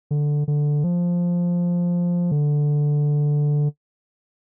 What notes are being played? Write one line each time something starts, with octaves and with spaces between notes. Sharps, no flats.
D3
D3
F3
D3